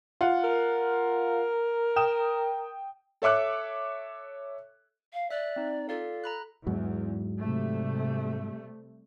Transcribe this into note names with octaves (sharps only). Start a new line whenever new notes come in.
F4 F#5
A#4
G5 D#6 E7
A4 C#5 E5 D6 F#6
F5
D5 E5 F#6
C4 D#4
F4 A4 D5 F5
A#5 B5 F#6
E2 G#2 F#3
C3 G3 A3